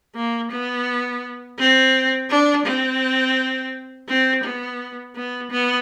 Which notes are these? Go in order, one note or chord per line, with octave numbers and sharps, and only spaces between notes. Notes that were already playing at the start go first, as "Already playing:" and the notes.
A#3
B3
C4
D4
C4
C4
B3
B3
B3